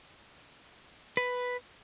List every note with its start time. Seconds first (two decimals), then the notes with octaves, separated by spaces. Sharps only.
1.17 B4